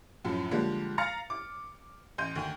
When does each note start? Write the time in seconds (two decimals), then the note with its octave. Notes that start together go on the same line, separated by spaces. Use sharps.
0.25 F#2 A2 F3
0.51 D3 F3 G3 G#3 A#3
0.98 F5 A#5 F6 A6 C#7
1.30 D6
2.18 A1 C6 G6 D#7
2.35 D2 D#3